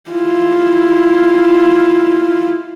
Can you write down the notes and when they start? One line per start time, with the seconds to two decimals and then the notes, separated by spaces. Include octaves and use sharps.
0.10 E4 F4